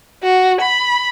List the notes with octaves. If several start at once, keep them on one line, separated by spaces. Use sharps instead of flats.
F#4
B5